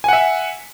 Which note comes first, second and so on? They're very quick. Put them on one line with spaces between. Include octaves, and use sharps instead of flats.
G#5 F#5 E5